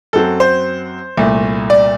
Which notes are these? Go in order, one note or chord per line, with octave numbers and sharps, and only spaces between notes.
F#2 F#3 C4 A4
C5
C2 A#2 A3
D5